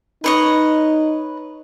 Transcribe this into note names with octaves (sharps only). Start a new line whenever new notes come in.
D#4 B4 C#5 D#5